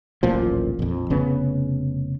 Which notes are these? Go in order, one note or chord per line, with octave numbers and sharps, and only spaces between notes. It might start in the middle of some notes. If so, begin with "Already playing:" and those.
D1 A1 A#2 F3
A#1 F2
F1 C#3 B3